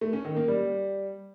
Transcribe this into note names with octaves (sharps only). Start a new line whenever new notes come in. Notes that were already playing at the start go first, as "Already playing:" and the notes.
A3
C#4
D#3
A#3
G3